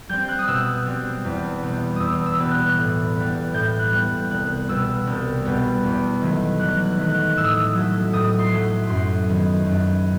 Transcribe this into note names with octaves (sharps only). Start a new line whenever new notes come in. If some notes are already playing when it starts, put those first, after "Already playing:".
G3 C4 G6
F#6
D#6
B2 E6
G3 C4
E2
B2 G3 B3
E2 D#6 E6
E6
B2 G3 B3
F#6
A2
G3 B3
A2 G6
F#6
G3 B3
C2 F#6
B2 G3 B3 E6
C2
B2 G3 B3
E2
D#3 F#3 A3
E2 F#6
F#6
D#3 F#3 A3
F#6
A2 E6
D#6
E6
F#3 A3
A2 D#6
C6
F#3 A3
F#2 C6
D#3 F#3 B3
F#2